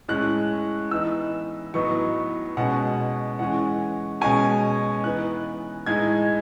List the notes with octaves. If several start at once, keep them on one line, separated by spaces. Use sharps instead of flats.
A2 G#3 C#4 F#6
E3 B3 D#4 E6
A2 F#3 B3 D#4 C#6
B2 G#3 C#4 F#5
E3 G#3 C#4 F#5
B2 G#3 C#4 G#5
E3 B3 D#4 F#6
A2 G#3 D#4 G#6